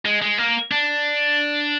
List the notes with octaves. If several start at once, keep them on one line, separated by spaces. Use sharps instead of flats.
G#3
G#3
A#3
D4